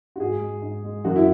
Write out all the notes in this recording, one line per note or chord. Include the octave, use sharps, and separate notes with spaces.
F#4
G#2 G#4
G#3
G#2
G#3
F#2 F#4
E4